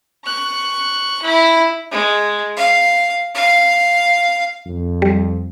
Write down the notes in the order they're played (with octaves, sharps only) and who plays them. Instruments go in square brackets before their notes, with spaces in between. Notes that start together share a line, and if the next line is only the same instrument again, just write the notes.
[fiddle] C#6 F#6
E4 B5
G#3
F5
F5
[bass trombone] F2
[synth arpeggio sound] G3